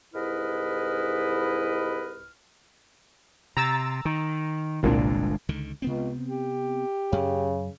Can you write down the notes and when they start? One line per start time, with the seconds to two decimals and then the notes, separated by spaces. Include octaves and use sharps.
0.14 C2 G#2 E4 B4 D#5 F6
3.57 C3 A#5 E6 A6
4.05 D#3
4.83 G1 C2 A#2 G#3 D4
5.49 C#2 D3 D#3
5.82 C#2 C3 B3 C4
6.28 G4
7.12 F#2 C#3